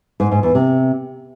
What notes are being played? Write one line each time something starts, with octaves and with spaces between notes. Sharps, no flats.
G#2
G#2
E2
C3